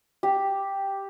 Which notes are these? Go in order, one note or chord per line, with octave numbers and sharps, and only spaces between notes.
G4